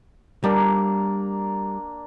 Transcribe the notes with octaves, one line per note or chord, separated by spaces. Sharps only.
G3 A#3 D4 A#4